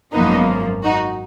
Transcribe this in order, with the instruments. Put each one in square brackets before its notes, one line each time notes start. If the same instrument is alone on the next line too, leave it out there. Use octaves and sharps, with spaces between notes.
[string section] G#1 F#2 F3 A#3 B3 D#4
D#4 F#4